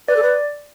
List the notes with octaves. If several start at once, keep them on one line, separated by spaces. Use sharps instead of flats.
B4 D5
A4
B4